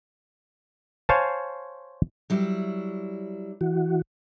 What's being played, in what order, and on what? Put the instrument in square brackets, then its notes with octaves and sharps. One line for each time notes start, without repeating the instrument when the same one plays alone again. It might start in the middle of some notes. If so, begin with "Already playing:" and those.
[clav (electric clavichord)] C5 C#5 F5 G#5 A5
[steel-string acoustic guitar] F#3 G3 E4
[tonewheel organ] E3 F#4